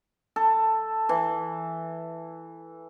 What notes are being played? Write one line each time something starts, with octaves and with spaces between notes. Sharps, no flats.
A4
E3